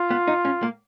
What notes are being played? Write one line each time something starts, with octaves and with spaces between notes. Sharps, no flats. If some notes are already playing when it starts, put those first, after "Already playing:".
Already playing: F4
B3
D#4
C#4
A#3